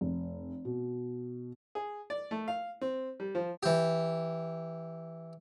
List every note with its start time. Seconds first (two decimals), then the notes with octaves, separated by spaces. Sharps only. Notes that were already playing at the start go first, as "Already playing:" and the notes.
0.01 F1
0.65 B2
1.75 G#4
2.10 D5
2.31 A3
2.48 F5
2.81 C4
3.20 G3
3.35 F3
3.63 E3 G4